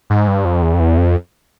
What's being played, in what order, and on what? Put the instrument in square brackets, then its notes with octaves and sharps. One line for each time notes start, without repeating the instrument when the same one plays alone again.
[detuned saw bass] G#2
G2
F2
E2
F2
E2
F2